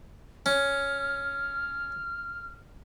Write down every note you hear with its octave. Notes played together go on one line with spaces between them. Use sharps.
C#4 F6